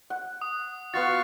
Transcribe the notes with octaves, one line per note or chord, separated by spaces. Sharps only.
F#5
D#6
B3 F4 F#4 F5 C#6 A6